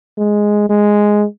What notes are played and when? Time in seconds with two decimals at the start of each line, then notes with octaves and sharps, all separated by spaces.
0.18 G#3
0.70 G#3